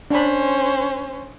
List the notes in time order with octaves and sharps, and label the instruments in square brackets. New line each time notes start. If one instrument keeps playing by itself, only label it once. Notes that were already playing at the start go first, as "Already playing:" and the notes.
[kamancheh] C#4 C5 [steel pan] D4 B5